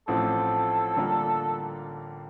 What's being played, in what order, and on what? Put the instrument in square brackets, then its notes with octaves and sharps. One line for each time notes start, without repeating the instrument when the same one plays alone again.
[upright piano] A1 A2 F3 C4 F4 [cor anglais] A4
[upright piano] D3 G3 A#3 F4 A#4